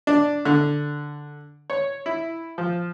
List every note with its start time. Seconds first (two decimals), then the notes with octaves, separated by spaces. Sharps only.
0.07 D4
0.45 D3
1.70 C#5
2.06 E4
2.58 F3